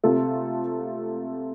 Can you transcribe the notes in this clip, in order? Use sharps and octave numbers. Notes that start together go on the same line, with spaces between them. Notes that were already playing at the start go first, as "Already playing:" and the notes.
C3 A3 F4 A4